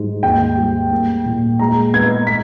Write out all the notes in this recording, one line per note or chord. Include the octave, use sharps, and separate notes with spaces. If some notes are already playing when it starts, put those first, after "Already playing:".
Already playing: G#2 G3
D#2 G5
G3
A#3
A#2
G#3 A#5
B3 G#6
B3 B6